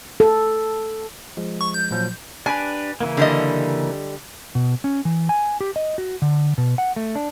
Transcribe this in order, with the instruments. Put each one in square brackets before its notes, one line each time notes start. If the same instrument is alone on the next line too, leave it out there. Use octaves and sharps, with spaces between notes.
[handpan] A4
[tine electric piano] F3 G#3
[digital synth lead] C#6
G6
[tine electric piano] A#2 F3 F#3
[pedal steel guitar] D4 G4 B4 [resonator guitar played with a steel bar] G#5
[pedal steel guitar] C#3 E3 A#3
[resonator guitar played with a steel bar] D3 G3 D#5
[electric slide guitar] B2
C#4
E3
G#5
G4
D#5
F#4
D3
B2
F#5
A3
D4